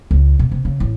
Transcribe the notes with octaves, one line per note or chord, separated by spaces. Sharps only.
C#2
B2
C3
C#3
A1